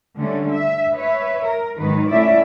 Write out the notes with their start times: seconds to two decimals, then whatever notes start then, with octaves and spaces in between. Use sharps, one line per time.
0.17 D3 G3 A3 C#4
0.52 E5
0.95 B4 C#5 E5
1.47 A#4
1.78 G#2 D#3 F#3 B4
2.09 A2 A3 C#4 E4 D5 E5